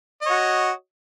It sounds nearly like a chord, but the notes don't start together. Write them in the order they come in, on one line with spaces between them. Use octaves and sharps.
D#5 C#5 F#4